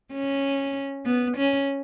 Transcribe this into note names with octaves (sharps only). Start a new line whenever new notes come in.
C#4
B3
C#4